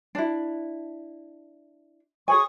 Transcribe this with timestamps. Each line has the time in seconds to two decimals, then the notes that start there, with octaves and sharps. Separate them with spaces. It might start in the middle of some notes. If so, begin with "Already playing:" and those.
0.15 D4 E4
2.28 G#4 C#5 G#5 C#6 D#6